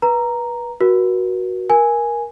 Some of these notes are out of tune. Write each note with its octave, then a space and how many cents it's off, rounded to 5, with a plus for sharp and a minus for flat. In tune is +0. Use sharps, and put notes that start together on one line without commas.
B4 -25 A#5 +0
F#4 +0 A#4 +45
A#4 +20 G#5 +0